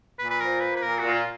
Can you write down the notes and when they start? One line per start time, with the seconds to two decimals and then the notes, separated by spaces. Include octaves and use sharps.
0.18 A#2 B4
0.30 B4
0.40 F3 A#4
0.60 A#3 B4
0.76 B4
0.82 A#2 A#4
0.99 A#2 F#4
1.15 F4